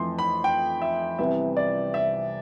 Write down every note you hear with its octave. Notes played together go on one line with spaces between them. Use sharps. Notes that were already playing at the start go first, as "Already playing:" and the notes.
Already playing: F2 E3 A3 C6
B5
G5
E5
C2 C3 E3 B3 E5
D5
E5